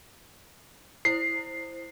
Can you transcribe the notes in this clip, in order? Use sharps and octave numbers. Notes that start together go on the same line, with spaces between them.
E4 C5 C7